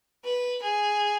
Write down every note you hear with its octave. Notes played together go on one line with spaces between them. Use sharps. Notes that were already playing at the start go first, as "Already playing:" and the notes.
B4
G#4